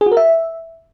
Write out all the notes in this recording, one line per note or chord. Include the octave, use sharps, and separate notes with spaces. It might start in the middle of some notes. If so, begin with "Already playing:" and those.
G#4
F#4
A#4
E5